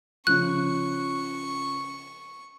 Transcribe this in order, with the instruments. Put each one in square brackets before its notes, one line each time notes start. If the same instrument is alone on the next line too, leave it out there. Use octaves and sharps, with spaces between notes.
[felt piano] C#3 F3 [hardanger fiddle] C#6 [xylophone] F#6